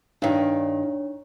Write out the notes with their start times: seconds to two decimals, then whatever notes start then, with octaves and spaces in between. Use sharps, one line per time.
0.22 G2 D#3 D4 C#5